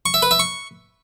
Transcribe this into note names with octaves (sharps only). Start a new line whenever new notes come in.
C#6
E5
B4
E5
C#6